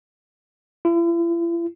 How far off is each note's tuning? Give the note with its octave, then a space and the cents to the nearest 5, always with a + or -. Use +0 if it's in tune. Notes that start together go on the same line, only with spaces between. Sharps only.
E4 +45